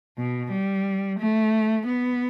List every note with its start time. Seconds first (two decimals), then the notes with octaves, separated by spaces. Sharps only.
0.18 B2
0.52 G3
1.20 A3
1.87 B3